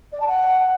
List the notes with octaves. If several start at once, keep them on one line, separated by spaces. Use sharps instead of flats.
D5
A5
F#5